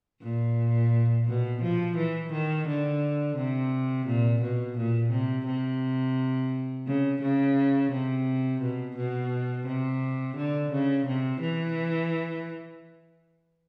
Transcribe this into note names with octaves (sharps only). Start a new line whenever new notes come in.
A#2
B2
F3
E3
D#3
D3
C3
A#2
B2
A#2
C3
C3
C#3
C#3
C3
B2
B2
C3
D3
C#3
C3
E3